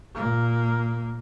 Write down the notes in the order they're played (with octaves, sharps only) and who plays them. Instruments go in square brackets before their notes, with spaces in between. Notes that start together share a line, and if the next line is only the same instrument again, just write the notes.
[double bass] A#2 A#3